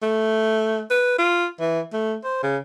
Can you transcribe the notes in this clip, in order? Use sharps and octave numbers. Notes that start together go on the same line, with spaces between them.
A3
B4
F4
E3
A3
C5
C#3